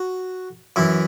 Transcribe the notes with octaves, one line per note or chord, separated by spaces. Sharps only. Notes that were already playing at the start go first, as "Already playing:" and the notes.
Already playing: F#4
F#2 E3 E4